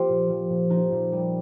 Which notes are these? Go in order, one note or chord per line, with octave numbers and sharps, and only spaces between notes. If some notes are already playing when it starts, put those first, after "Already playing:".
Already playing: F3 A#3 C4 F4 G4
A#2
F3
A#2
F3 D#4
A#2
G3